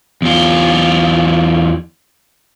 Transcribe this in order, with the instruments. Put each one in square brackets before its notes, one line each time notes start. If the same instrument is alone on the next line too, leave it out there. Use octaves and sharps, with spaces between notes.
[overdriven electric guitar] E2 F4